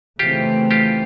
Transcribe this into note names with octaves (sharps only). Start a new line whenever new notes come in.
C#3 E3 A3 C4 F4 G4
F4 G4